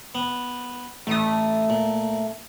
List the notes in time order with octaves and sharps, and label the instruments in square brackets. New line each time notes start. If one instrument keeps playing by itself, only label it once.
[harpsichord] B3
[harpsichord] A1 D#6 [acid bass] A3
[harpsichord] A#2